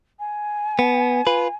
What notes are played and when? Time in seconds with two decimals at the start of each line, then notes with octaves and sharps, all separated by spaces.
0.19 G#5
0.79 B3
1.27 F4 B4